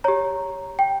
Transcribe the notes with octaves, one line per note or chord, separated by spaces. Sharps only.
G4 C#5 A#5
G5